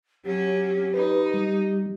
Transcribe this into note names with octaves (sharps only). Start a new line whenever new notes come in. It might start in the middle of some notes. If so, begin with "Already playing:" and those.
F#3 C#4 G4
D#4 B4
G3